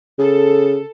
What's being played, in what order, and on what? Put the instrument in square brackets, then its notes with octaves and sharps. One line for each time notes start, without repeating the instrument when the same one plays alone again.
[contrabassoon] C#3 [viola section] A4